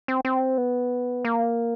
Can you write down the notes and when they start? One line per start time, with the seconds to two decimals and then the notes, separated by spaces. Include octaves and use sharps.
0.08 C4
0.25 C4
0.58 B3
1.25 A#3